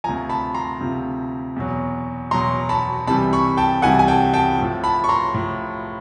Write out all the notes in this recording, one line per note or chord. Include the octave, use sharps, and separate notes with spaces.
D2 C3 F3 G#5 A#5
A5 B5
A#5 C6
D2 C3 F3
E2 B2 F#3
E2 B2 F#3 A#5 C6
A5 B5
C2 C3 E3 G3 A5 B5
B5 C#6
G5 A5
C2 C3 E3 G3 F#5 G#5
G#5
G5 A5
G5 A5
A2 F3
A5 B5
C#6
A#5 C6
A2 F3